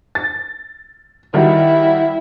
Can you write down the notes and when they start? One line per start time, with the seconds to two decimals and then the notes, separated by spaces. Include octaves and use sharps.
0.15 A6
1.34 D#3 G3 E4 F#4